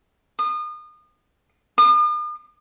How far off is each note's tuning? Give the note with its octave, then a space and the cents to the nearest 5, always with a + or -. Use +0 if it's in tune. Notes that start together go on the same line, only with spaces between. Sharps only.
D#6 -35
D#6 -45